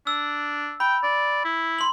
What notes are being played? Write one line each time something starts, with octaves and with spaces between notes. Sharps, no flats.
D4 E6
G5 B5
D5
E4
C6 F#7